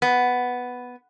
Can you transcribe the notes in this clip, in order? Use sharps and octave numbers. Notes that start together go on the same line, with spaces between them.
B3